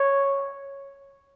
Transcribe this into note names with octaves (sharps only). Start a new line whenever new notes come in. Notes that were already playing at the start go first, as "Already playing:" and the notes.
Already playing: C#5